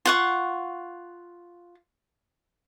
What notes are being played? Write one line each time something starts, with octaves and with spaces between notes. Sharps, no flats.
F4 F#5 C#6